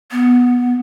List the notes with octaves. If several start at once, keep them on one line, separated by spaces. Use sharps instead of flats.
B3